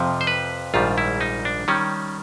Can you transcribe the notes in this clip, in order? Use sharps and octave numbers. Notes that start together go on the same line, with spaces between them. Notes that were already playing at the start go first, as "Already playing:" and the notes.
Already playing: F2 C3 F3
C5
B4
A#1 G#2 D#3 G3 F4
E4
D#4
D4
D#3 G3 C#4